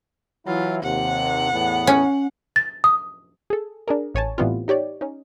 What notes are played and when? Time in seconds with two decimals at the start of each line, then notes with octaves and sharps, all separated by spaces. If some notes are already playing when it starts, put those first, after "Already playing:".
0.47 E3 F#3 E4 F4
0.83 D#2 C3 F#5
1.52 E2 A2 B3
1.87 C#4
2.56 A6
2.84 D#6
3.50 G#4 A4
3.88 D4 G#4 A#4
4.15 A1 C#5 G#5 A5
4.38 A2 E3 G3 B3 C4 F4
4.68 D#4 G4 C#5 D5
5.01 C#4 D#4